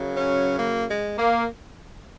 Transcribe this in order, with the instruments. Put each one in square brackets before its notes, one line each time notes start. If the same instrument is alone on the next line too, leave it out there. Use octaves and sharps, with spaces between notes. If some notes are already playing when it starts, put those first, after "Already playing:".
Already playing: [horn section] F#2 C#3 F#3
C#4
A#3
G#3
A#3